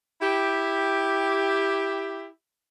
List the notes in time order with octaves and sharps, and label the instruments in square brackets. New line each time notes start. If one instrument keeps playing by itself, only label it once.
[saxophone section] E4 G4